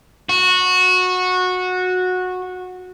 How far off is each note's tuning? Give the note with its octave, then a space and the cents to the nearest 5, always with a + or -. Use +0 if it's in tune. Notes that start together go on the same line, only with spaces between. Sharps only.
F#4 -15